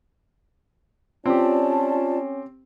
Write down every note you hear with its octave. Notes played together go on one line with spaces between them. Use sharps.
C4 C#4 F4 G4 D5 A5